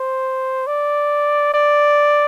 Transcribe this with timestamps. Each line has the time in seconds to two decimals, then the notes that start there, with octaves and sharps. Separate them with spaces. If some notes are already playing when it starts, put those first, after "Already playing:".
Already playing: C5
0.67 D5
1.53 D5